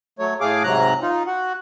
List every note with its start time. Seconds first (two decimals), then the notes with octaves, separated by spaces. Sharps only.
0.19 F#3 A3 C#5
0.41 A2 A3 G#4 F5 D6
0.63 G#2 C3 F#3 A#5 F#6
1.02 D#4 F4
1.27 F#4 F#5